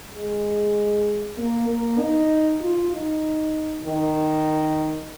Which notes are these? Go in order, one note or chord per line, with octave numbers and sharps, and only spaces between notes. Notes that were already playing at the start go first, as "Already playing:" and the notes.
G#3
A#3
A#3
D#4
F4
D#4
D#3